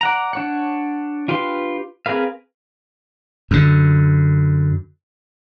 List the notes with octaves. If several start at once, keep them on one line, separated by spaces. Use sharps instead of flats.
D5 F#5 A#5
D4 C#5 F#5
D4 F4 G4 B4 C6
C4 G#4 A#4 B4 F5
F#2 D3